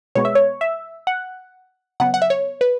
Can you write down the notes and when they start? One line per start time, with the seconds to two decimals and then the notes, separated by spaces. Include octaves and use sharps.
0.15 B2 G#3 B3 C#5
0.25 E5
0.35 C#5
0.61 E5
1.07 F#5
2.00 C#3 F#3 B3 F#5
2.14 F#5
2.22 E5
2.30 C#5
2.61 B4